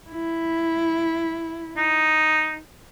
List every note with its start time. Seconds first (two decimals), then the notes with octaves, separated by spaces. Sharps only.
0.11 E4
1.77 D#4